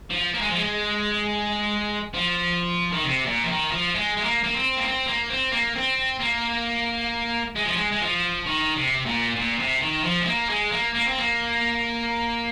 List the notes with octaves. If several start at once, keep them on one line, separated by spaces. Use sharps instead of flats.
F3
A#3
G#3
F3
G#3
F3
D#3
C3
A#2
F3
D#3
F3
G#3
G#3
A#3
A#3
C4
A#3
C4
A#3
C4
A#3
C4
A#3
G#3
F3
G#3
G#3
F3
D#3
C3
A#2
A#2
C3
D#3
F3
G#3
A#3
G#3
A#3
A#3
C4
A#3